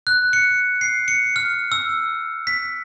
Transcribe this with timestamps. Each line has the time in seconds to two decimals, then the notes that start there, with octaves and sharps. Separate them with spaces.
0.07 F#6
0.33 C#7
0.81 C7
1.08 C#7
1.36 F6
1.72 E6
2.47 B6